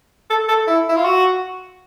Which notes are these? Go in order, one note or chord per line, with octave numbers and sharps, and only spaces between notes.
A4
A4
E4
E4
F4
F#4